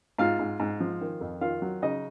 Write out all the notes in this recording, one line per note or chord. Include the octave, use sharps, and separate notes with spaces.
G#2 F4 F5
G#2
G#2
F3
D#3
F2
D#3 F4 F5
F#3
C#3 D#4 D#5